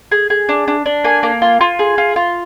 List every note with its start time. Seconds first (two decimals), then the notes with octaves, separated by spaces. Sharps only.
0.12 G#4
0.30 G#4
0.49 D4
0.68 D4
0.86 D4
1.04 A#3 G#5
1.23 A#3
1.42 F4
1.61 F4
1.79 G#4
1.98 F4
2.16 F4